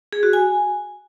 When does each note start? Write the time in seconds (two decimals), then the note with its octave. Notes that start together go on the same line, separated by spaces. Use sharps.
0.13 G#4
0.23 F#4
0.33 G#5